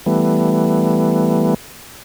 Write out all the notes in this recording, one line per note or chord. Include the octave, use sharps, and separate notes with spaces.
E3 G3 A3 B3